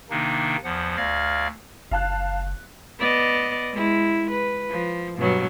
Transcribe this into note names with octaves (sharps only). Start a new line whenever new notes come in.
C3 D#3 A#3 D4 D#4
E2 F3 F#5
D2 D5 F5 F6 G#6 A#6
F#1 F5 A5 F#6
B3 D5 D#5
G#3 E4
B4
F3
G2 B2 F#3